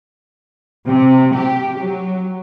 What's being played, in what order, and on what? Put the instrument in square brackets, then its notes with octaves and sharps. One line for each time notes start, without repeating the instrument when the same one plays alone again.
[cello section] C3
G4
F#3